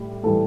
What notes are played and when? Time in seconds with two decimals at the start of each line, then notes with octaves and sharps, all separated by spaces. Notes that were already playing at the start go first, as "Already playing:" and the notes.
Already playing: A2 G3
0.23 A2 E3 G3 A4